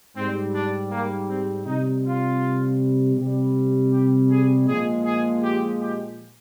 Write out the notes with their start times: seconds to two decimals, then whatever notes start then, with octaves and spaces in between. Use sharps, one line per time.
0.15 G#2 G3 C4
0.53 D4
0.90 A#3
1.28 C4
1.65 C3 G3 D#4
2.03 F4
3.16 C3 G3
3.92 G4
4.29 G#4
4.66 A#2 F3 G#3 G#4
5.04 G#4
5.42 G4
5.80 G4